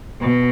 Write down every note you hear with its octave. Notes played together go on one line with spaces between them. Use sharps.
B2